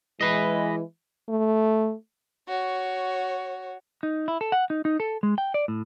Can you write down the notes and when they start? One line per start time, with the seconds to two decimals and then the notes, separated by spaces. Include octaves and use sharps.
0.21 E3 G#3 B4 D#5
1.29 A3
2.48 F#4 C#5
4.03 D#4
4.28 E4
4.41 A4
4.52 F#5
4.70 D#4
4.85 D#4
5.00 A4
5.23 G#3
5.38 G5
5.54 D5
5.68 A2